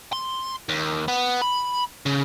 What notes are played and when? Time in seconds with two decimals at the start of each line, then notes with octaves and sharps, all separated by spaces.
0.13 C6
0.69 D#2
1.08 B3
1.42 B5
2.06 C#3